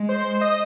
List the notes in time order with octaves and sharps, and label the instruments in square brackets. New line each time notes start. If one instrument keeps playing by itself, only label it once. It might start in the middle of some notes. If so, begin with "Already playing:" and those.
Already playing: [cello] G#3
[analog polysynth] C5
D#5